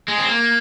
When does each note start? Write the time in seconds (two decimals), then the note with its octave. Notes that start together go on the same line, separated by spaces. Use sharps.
0.08 G#3
0.18 C4
0.29 A#3